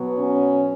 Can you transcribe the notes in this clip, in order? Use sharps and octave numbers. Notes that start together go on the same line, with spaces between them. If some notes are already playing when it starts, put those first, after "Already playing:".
Already playing: B2 F#3 B3
C#4